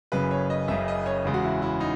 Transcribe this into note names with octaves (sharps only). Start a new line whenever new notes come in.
F#1 F#2 C#3 B4
C#5
D#5
F#1 F#2 C#3 E5
D#5
C#5
E2 C#3 G#3
F#4
E4
E4
D#4